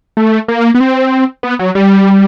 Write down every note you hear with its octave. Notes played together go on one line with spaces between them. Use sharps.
A3
A#3
B3
C4
B3
F#3
G3